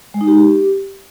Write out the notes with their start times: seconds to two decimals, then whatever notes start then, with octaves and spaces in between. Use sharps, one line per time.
0.14 G#3
0.21 D#4
0.27 G4